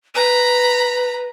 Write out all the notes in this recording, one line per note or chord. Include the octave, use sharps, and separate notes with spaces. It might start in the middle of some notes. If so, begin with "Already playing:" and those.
B4 A#5 B5